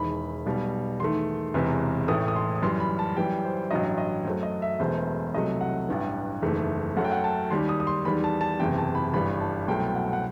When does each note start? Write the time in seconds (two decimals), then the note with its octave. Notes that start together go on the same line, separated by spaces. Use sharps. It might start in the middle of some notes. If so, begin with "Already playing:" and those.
Already playing: E1 E2 D#3 B5
0.46 B1 B2 G3
1.00 E2 D#3 A3 C6
1.54 E1 E2 C3 E3
2.08 A1 A2 E3 A3 D#6
2.28 D#6
2.36 C6
2.55 D#6
2.62 F#2 E3 G3 C6
2.80 B5
2.99 A5
3.17 F#2 E3 G3 G5
3.44 C5
3.71 A1 G2 F#3 D#5
3.98 D#5
4.25 F#2 F#3 A3 C5
4.43 D#5
4.62 E5
4.80 E1 E2 B2 A3 C5
5.33 C2 C3 F#3 A3 D#5
5.61 F#5
5.89 A1 G2 E3
6.42 F#1 E2 D#3 A3
6.97 F#2 F#3 A3 F#5
7.04 G5
7.12 F#5
7.24 A5
7.50 D#2 D#3 G3 C6
7.69 D#6
7.80 D#6
7.87 C6
8.05 E2 D#3 G3 B5
8.24 A5
8.41 A5
8.59 F#1 E2 C3 G5
8.78 A5
8.95 B5
9.14 G1 G2 E3 G3 B5
9.40 A5
9.68 C2 B2 F#3 A3 G5
9.96 F#5
10.13 F#5